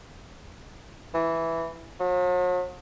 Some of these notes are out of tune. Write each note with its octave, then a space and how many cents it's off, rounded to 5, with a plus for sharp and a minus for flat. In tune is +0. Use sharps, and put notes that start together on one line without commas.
E3 +0
F#3 -45